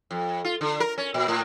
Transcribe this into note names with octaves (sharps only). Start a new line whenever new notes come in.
F2
F4
D3
A#4
C#4
A#2
A2